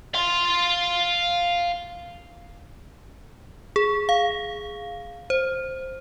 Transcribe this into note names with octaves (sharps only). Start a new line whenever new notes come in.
F5 C6
G#4
F5
C5